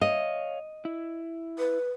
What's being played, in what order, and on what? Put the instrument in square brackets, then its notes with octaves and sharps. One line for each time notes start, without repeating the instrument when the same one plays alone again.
[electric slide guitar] C#5 F5 [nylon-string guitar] D#5
[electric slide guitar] E4
[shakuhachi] B4